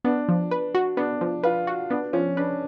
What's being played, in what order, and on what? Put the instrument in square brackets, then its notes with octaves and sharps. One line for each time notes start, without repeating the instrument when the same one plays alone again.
[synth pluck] B3 [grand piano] D4
[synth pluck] F3
B4
F#4
[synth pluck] B3 [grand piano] D4
[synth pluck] F3
[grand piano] F4 [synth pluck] B4
[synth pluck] F#4
[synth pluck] B3 [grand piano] D4
[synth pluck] F3 [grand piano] C#4
[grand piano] D4 [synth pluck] B4